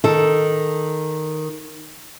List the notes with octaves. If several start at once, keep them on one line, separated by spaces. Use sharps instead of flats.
D#3 A4